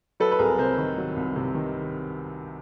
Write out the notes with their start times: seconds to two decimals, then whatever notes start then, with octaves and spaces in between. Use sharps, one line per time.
0.20 F#3 A4 B4
0.31 B4
0.39 C2 G#4 A#4
0.58 C3 A#4 C5
0.77 D#3
0.98 F#3
1.16 C2
1.36 C3
1.55 D#3